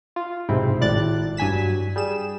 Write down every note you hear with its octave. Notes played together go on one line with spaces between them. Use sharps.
F4
B1 G#2 C3 C4 E4
G#1 A2 D5 F#6 A6
G2 F#3 G#5 B6 E7
G3 G#4 E7